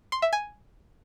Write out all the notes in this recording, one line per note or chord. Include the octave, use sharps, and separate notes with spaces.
C6
E5
G#5